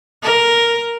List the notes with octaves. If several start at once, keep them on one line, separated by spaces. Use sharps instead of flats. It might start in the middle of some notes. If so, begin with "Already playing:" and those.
A#4